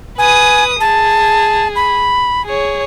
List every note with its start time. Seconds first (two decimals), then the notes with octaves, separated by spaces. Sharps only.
0.18 B4 G#5 D#6
0.80 G#4 A5
1.76 B5
2.45 G#4 C#5